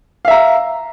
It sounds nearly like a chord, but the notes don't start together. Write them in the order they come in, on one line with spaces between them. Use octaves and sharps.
F5 E5 A#5